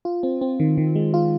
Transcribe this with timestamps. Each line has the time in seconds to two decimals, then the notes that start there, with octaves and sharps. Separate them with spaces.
0.05 F4
0.23 C4
0.41 C4
0.60 D#3
0.78 D#3
0.95 G#3
1.14 F4